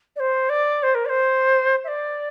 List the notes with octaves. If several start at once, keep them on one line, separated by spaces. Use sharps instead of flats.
D5
C5
D5
C5
A#4
D5
C5
E5
D5